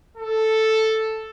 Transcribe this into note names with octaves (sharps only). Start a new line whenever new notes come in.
A4